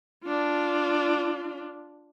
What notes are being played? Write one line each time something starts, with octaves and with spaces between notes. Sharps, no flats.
D4 F4